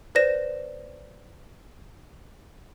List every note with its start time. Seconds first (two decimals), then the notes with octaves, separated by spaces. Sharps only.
0.15 B4 C5 D5 A#6 E7